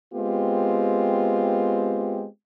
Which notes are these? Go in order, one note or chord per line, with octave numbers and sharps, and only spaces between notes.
G#3 B3 C4 F4 G4